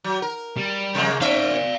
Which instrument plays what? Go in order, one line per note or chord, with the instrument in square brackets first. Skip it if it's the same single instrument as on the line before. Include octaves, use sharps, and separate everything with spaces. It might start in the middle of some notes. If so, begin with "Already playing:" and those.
[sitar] F#3
A#4
[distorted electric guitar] G3
[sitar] C3 G#3 A#3
[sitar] C4 E5 [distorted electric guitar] D5 F5